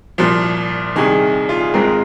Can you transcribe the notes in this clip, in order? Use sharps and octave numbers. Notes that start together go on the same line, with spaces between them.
C2 A#2 F3
C2 C3 D#3 G#4
F4
G#4
G#1 G#2 G#3 C4 F4 A#4